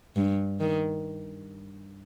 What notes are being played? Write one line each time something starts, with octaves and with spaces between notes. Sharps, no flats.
G2
D#3